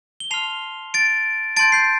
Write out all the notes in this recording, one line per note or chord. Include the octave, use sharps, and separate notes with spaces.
G7
A5 C6 F6 C7 F7
A6 D7
A5 C6 G6 A6 D7
G6 C7